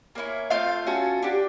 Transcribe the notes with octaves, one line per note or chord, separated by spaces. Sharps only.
A#3 C#4 E4
A3 C4 F4 F5
C#4 F#4 A4
D4 G4